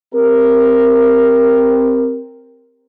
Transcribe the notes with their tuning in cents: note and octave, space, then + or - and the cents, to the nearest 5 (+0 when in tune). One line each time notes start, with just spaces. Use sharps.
C4 +0 G4 +0 A#4 +0